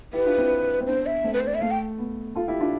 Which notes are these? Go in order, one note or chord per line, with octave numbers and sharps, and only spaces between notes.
E4 G4 B4
D4 F4
C4 E4
C4
B3 D4 C5
E5
A3 C4
B4
C5
D5
E5
A3 F5
G5
B3
F4 A4
E4 G4
D4 F4